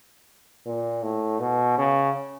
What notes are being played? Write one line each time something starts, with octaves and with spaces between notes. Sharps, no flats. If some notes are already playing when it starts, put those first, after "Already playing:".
A#2
A2
B2
C#3